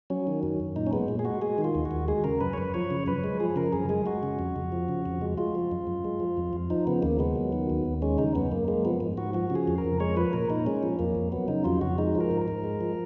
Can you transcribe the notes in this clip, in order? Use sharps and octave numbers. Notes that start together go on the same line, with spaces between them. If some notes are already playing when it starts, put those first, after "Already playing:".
F#3 C#4
D#3
F#2
F#2
A#2 D#4
C#4
G#3 B3
A#2
G#4
G#3 F#4
G#3 G#4
D#3
F4
D#2
F#4
D#2
G#3 G#4
C#3 A#4
F#2 B4
C#5
F#2 B4
F3 C#5
C#3
F#2 B4
G#3
F3 G#4
C#3 A#4
F#2 G#4
G#3 G#4
G#3 F#4
C#3
F2
F2
F3
C#3
F2
G#3
G#3 F4
F3
F#2
F#2
G#3
F3
F2
F2
F3 D#4
C#3 B3
D#2 A#3
G#3 B3
F#3
D#3
D#2
D#2
G#3 C#4
C#3 D#4
F#2 B3
F#2 A#3
G#3 A#3
F3 B3
G#2
G#2 F#4
F3 F#4
C#3
G#4
F2
A#4
F2
G#3 C#5
F3 B4
A#2 A#4
A#2 D#4
G#3 C#4
F3
F2 A#3
F2
F#3 B3
C#3 D#4
F2 F4
F2 F#4
G#3 D#4
F3
A#4
G#2
A#4
G#2
G#3
F3